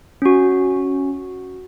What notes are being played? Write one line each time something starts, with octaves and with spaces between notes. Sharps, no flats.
C#4 F#4